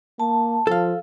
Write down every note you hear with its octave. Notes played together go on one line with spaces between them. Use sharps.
A#3 A5
F3 A4 F5